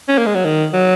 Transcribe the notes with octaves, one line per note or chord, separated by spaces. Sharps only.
C#4
A#3
G#3
F#3
D#3
F#3